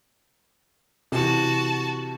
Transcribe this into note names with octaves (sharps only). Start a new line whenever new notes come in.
C3 E3 F#4 A5